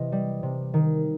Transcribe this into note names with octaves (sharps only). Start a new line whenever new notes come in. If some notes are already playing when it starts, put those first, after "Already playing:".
Already playing: C3 E3 D#5
G3
C3
D#3